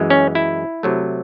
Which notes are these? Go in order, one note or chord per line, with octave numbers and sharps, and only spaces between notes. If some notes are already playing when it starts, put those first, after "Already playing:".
Already playing: F#2 E3 G#3
C#4
E4
C3 F#3 A3